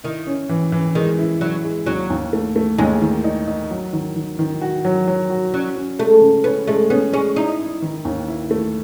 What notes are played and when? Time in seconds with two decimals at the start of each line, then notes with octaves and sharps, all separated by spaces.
0.04 D#3 E4
0.27 C#4
0.49 E3
0.72 E3
0.95 D#3 G#3
1.19 E4
1.41 F#3 E4
1.64 G#3
1.86 D#2 F#3
2.10 D#2
2.33 A3
2.56 A3
2.78 D#2 G#3
3.01 D#3
3.24 D#4
3.47 D#4
3.70 F#3
3.93 D#3
4.16 D#3
4.39 D#3
4.62 F#4
4.85 F#3
5.08 F#3
5.30 F#4
5.54 F#3 C#4
5.76 C#4
5.99 G#3 A3
6.21 C#3
6.44 B3 C#4
6.67 G#3 A3
6.90 B3 C#4
7.13 G#3 C#4
7.36 D#4 E4
7.59 E4
7.82 D#3
8.05 D#2
8.28 E4
8.51 A3